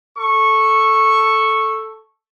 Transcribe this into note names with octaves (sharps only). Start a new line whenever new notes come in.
A4 C#6